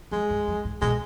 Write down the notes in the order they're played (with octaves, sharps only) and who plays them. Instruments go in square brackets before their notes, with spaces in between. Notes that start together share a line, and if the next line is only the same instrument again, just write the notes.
[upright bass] F2 [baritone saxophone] G#3
[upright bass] G2
F2
G#2
[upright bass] B2 [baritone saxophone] G#3